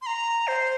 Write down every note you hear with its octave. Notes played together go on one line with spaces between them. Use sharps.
C6
A#5
C5